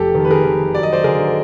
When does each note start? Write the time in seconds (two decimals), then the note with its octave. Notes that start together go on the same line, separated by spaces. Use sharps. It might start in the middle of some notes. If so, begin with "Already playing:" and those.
Already playing: F1 G4 A4
0.15 D#3
0.25 B4
0.31 G#4 A#4
0.45 D#3
0.75 F#3 D5
0.83 D#5
0.92 C5 D5
1.04 D3 G#4 A#4